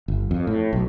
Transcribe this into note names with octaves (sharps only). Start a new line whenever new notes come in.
G1
F2
A2
B1